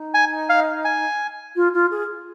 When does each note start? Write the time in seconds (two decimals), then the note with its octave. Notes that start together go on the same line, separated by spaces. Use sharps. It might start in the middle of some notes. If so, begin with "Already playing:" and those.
Already playing: D#4
0.14 G#5
0.49 F5
0.85 G#5
1.56 F4
1.73 F4
1.91 G#4